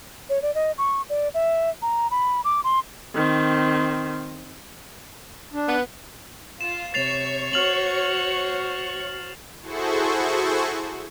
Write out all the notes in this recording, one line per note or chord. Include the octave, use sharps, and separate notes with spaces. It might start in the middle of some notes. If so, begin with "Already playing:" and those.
C#5
D5
D#5
C#6
D5
E5
A#5
B5
D6
C6
D#3 C4
D4
B3
F4 E7
C3 C#5 C#6 A6 C7 F7
F#4 C5 F6 F7 F#7
E4 F#4 G#4 A4 C5 C#6